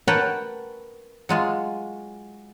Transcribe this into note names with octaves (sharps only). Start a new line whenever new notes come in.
A#4 B4 C#5 F#5 G5 A5
F#3 G#3 F4